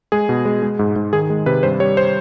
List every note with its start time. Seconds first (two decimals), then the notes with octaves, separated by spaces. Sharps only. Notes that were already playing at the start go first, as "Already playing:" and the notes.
0.12 G#3 G#4
0.29 B2
0.45 G#3
0.63 G#3
0.79 G#2
0.96 G#2
1.13 D#3 G#4
1.30 G#3
1.46 C3 B4
1.63 G2 C5
1.80 G3 C#5
1.97 C5